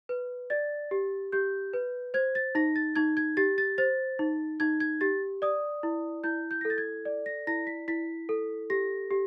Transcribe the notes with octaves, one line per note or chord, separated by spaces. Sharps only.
B4
D5 A6
G4
G4 G6
B4
C5 G#6
A6
D#4 A#6
A6
D#4 G#6
G#6
G4 A6
A6
C5 A6
D#4
D#4 G#6
G#6
G4 A6
D5 D#6
E4
E4 G6
G6
A#6
A4
A6
G#6
D5
A#6
E4 A#6
B6
E4 B6
A4
G4 A#6
G4